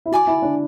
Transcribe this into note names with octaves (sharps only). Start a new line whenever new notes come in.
E4
F#4 D5 G#5 D6
E4
D4